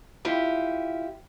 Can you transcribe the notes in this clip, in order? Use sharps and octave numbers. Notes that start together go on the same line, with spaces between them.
E4 F4 G4